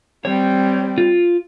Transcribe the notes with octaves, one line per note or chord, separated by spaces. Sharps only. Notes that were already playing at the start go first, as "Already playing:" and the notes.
G3 C4 C#5
F4